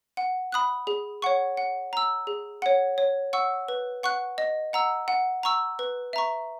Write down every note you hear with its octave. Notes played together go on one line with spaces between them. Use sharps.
F#5
B5 D#6 F#6
G#4
C#5 F#5 C#6
F#5
A#5 E6
G#4
C#5 F#5
C#5
F#5 C#6 E6
B4
F#5 C#6 F#6
D#5
F#5 A#5 E6
F#5
A#5 C#6 E6
B4
E5 A#5 C#6